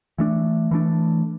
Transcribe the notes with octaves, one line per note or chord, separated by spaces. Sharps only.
E3 A3 D4
E3 A3 D4